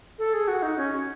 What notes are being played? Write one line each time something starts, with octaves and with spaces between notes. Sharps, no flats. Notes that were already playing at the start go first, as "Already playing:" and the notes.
A4
G#4
F#4
D#4
C#4